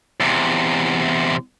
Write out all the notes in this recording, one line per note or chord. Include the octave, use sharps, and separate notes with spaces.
E2 C3